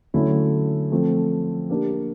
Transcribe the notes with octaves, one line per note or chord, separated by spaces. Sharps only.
D3 F#3 A3 C#4 E4
F3 A3 C4
A#3 D4 G4